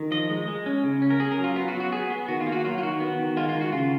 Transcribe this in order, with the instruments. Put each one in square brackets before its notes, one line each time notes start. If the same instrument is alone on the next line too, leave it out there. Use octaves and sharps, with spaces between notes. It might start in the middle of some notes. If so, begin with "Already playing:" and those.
Already playing: [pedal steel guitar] D#3
F3 D#5
G#3
G#3
C#4
C#3
C#4
A#4
C#4 G#4
A#4
F#3
F4
B3 F4
F#4
F#3
F#4
B3 G#4
B3
D#3 F#4
F4
A#3
F#4
F#3 F4
F4
D#3 F#4
B3
D#3
G#3 F4
F4
D#3
F#4
C#3 F4